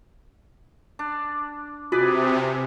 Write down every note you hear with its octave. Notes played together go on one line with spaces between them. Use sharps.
D4
C3 F4 F#4 G#4 B4 D5